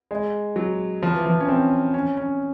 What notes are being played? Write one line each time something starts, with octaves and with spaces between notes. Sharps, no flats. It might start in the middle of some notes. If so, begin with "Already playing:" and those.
G#3
F#3
F3
E3
F3
C#4
C4
C#4
C#4